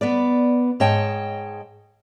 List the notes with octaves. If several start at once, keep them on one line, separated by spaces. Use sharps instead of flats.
B3 B4 D5
G#2 C#5 D#5 G5 A5